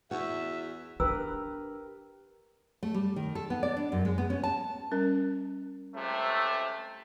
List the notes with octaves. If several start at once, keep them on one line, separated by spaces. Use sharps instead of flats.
E2 F#4 E5 F#5
D4 G4 A#4 B4 E6
A3
G3
D#3
A4
B3
D5
D4
F#2
G#3
B3
C#4
A5
G3 C#4 A#4
C#2 C3 A3